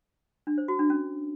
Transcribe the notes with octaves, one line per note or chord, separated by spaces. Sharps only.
D4
C5
F#4
D4
C#4